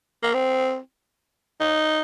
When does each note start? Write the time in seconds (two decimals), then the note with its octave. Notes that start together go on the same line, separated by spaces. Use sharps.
0.23 A#3
0.34 C4
1.60 D#4